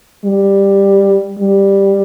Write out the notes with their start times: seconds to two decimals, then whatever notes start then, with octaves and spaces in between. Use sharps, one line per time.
0.25 G3
1.40 G3